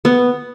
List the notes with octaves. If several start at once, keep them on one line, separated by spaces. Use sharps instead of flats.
B3